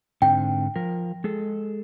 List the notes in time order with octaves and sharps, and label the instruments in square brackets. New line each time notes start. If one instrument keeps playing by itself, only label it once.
[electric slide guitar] G#2 D3 C4 [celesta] G5
[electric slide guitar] F3 A#4
G#3 G#4 A4